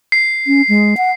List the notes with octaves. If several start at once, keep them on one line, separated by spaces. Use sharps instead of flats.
C7
C#4
G#3
F#5